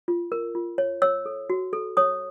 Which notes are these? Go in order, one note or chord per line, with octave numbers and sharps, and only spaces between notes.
F4
A#4
F4
C#5
C#5 E6
A4
F#4
A4
C#5 D#6